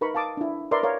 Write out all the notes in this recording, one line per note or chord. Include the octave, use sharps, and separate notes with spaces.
D#4 A#4 B4 B5 C#6
F5 A5 D6 D#6
D4 E4
A#4 B4 D5 E5 C6
A#4 C#5 F5